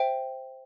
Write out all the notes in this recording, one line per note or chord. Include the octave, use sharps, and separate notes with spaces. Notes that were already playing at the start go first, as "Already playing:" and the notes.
Already playing: C5 E5 G5